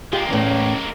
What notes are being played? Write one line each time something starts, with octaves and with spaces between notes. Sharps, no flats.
G#3 A#3 F4 G4
E2 A2 C#4 C#5